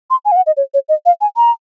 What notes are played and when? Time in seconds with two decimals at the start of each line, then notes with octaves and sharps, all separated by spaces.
0.10 C6
0.25 G#5
0.32 F5
0.36 F#5
0.46 D#5
0.57 C#5
0.74 C#5
0.89 D#5
1.06 F5
1.21 G#5
1.37 A#5